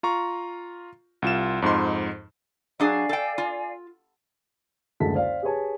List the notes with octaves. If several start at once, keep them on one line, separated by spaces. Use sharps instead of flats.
F4 A#5 C#6
C2 F4 E7
F2 G#2 D#4 C6
F#3 D4 G#4 D5 F5 G#5
A4 G5
F4
F#1 D2 D3 G#3 A5 B6
C5 D5 F5
G4 G#4 B4 C#5 G#5 A5